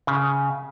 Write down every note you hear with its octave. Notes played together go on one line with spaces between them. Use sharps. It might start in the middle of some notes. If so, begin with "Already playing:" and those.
C#3